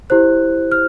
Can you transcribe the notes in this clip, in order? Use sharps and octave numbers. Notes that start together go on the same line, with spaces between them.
E4 G4 C5 F#6
F6